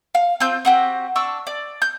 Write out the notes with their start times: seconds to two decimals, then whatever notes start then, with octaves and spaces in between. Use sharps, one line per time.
0.15 F5
0.40 C4 F4 G6
0.65 C4 F#4 G4
1.16 D4 C#6 E6
1.47 D5
1.82 G6